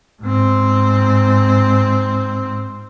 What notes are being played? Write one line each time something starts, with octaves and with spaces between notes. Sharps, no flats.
G#2 C4